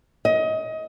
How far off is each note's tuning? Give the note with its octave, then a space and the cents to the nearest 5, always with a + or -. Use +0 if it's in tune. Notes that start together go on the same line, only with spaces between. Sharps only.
D#5 +25